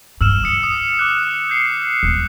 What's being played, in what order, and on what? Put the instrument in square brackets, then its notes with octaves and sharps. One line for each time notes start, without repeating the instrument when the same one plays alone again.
[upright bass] G2 [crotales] E6 F6 E7
[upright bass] D3 [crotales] D#6 C#7
[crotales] D#6
D6 F#6
G6 C7 C#7
[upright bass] D#1